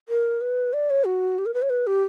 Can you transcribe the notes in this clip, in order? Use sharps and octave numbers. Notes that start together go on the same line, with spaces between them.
A#4
B4
D5
C#5
F#4
G4
A#4
B4
C#5
B4
G4